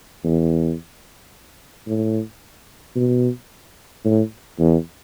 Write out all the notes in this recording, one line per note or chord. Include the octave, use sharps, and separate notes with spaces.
E2
A2
B2
A2
E2